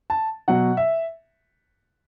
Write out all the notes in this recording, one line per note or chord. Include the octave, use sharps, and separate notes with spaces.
A5
B2 F#3 F#5
E5